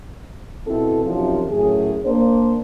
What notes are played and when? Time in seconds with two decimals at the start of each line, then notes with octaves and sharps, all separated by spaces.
0.67 B2 C4 E4 A4
1.06 F#2 C3 D#3 F3
1.50 F#2 A2 G#4
2.05 A#3 D4 C5